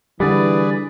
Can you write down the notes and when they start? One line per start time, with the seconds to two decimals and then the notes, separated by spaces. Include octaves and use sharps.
0.20 D3 E3 G3 G#4 B4 D5